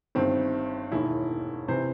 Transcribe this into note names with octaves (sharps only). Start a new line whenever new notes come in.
G1 G2 D#3 C4
E1 D#2 D#3 E4
C3 E3 C5